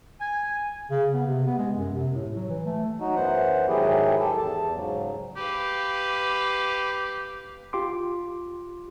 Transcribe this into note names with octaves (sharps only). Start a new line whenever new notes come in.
G#5
C#3
B3
C3
B3
G#3
F#2
C3
A2
F#3
E3
A3
F#3 D#4 F#4
F#2 E3 B3 C5 F#5
G#2 D#3 F#3 E4 G4 G#4
G4 A4
E2 A5
G#2 C#3 F#3
G4 B4 F5
F4 G4 C6 D6